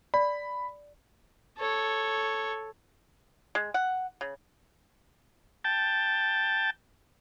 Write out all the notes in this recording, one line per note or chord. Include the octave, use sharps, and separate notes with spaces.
D5 B5
A4 C#5
G#3
F#5
C#3
G5 A5